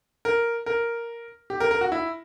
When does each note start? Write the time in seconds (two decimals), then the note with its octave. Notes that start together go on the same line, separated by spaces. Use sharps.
0.25 A#4
0.66 A#4
1.50 G4
1.60 A#4
1.71 A#4
1.81 F#4
1.92 E4